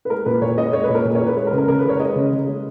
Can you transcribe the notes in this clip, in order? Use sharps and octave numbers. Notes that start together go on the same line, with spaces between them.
B4
G#3 A#4
A#2 B4
A#2 C#5
G#3 D#5
G#3 C#5
B4
A#2
A#4
A#2
C#5
G#3
B4
G#3 B4
A#4
C#3
A#4
C#3 A#4
B4
G#3
C#5
G#3 D#5
C#3
C#3
G#3